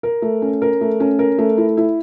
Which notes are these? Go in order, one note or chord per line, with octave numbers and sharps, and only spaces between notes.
A#4
A3
C#4
A#4
A3
C#4
A#4
A3
E4
E4